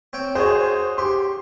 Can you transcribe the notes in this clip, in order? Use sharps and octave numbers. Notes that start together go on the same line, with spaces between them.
C4 C#5 G5
F#4 G#4 C5 C#5
G4 C6